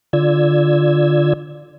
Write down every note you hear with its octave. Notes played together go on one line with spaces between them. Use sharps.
D3 F4 D5 E6 G#6